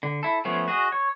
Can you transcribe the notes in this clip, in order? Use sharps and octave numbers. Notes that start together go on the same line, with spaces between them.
D3
E4 A4
F3 A3 B3 C#4
F#4 G#4 D#5
C#5